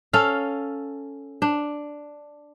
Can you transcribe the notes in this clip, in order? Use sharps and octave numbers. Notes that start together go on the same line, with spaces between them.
C#4 A4 F5
D4